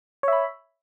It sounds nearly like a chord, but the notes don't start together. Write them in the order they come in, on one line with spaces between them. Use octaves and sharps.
C#5 E5 B5